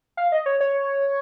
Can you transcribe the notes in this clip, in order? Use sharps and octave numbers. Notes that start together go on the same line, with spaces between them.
F5
D#5
C#5
C#5